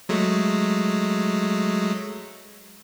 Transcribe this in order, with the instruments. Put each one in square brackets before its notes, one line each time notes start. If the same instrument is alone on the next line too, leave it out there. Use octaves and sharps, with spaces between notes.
[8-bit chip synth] F#3 G#3 A3